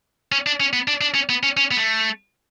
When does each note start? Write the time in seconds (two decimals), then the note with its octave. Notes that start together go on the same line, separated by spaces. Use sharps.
0.32 C#4
0.46 D4
0.60 C#4
0.73 B3
0.88 D4
1.01 D4
1.14 C#4
1.29 B3
1.43 C#4
1.57 C#4
1.71 B3
1.77 A3